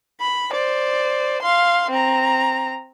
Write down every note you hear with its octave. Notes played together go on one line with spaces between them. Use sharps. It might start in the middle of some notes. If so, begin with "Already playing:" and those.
B5
C5 D5
F5 C6
C4 A#5